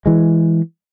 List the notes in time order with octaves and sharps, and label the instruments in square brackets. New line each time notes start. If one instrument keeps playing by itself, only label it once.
[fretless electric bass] E3 G#3